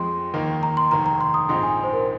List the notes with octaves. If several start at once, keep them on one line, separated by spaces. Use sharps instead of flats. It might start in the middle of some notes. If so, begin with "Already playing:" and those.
Already playing: F2 F3 G#3 C4 C6
D#2 D#3 A#3 D#4
A#5
C6
F1 D#2 D#3 A#5
A#5
C6
D#6
A#1 G#2 F3 C4 D#4 C6
G#5
C5
A#4